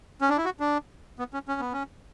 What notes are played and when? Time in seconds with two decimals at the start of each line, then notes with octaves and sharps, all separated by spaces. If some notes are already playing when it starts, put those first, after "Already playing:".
0.21 C#4
0.29 D4
0.37 E4
0.45 F#4
0.60 D4
1.19 B3
1.34 C#4
1.48 C#4
1.60 B3
1.73 C#4